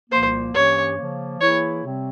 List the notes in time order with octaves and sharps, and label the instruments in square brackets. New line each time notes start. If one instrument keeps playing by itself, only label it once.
[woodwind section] C2 A#2 F3 A#3 [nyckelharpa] C5
[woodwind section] G2 E3 A#3 C#4 G4 [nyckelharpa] C#5
[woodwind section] C#3 F3 A#3
[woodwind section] E3 A#3 E4 G#4 [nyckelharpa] C#5
[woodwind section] C3 G3 C4